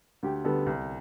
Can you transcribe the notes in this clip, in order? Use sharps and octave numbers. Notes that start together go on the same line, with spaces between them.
D2 G4
D3 G3 B3 A4
C2